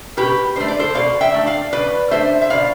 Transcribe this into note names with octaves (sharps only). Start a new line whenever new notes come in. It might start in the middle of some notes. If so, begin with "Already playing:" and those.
B2 G4 B4
A3 D4 C5
D5
A4 C5
B2 D5 F5
E5 G5
A3 D4
D5 F5
B2 B4 D5
A3 D4 C5 E5
E5
B2 D5 F5